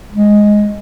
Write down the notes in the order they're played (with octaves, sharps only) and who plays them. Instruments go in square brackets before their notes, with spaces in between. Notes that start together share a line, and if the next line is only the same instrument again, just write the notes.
[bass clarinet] G#3